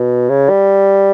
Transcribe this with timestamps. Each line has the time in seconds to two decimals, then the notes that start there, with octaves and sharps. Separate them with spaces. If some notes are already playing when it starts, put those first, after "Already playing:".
Already playing: B2
0.30 C#3
0.49 G3